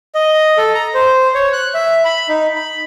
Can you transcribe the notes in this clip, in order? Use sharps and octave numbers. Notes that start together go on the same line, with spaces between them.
D#5
A4
A#5
C5
C#5
F#6
E5
B5
D#4
B5